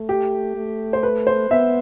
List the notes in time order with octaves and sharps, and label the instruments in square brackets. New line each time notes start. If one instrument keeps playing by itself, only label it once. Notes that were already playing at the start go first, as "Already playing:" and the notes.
Already playing: [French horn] A3
[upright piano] G4
[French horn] A3
[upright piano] C5
B4
C5
[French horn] B3 [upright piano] E5